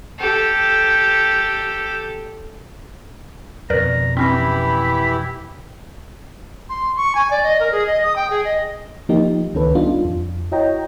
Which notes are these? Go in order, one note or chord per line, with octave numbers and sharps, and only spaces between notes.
G4 A4
F2 B2 A#4 B4 D5 A#5
E3 C4 C#4 E4 G4 B5 B6
C6
C#6
G#5
D5
D#5
A#4
G#4
D#5
D#6
G5
G#4
D#5
F3 A#3 D#4 G4
C#2 D#3 C#4 A4 B4
G3 B3 D4 D#4 F4
F2
E4 F#4 C#5 D#5 G5 A#5